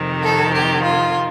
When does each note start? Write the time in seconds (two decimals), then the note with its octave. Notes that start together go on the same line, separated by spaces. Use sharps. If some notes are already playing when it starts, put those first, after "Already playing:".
Already playing: F2 C3 D#3
0.23 A4
0.53 G4
0.83 F4